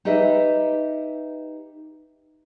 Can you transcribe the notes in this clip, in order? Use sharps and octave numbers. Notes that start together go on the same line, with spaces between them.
D#4 G4 B4 D#5 E5